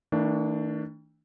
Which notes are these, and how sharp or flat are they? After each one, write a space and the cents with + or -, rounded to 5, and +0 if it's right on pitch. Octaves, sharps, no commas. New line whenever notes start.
D#3 +45 A3 +35 D4 +0